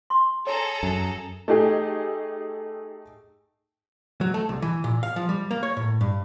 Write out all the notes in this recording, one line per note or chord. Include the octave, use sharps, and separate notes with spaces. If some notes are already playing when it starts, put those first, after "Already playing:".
C6 C#6
G#4 A4 C#5 A#5
F#2
A3 D#4 G4 G#4
F#3
A3
C2
E3
A#2
F5
F3
G3
A#3
C#5
A2
G2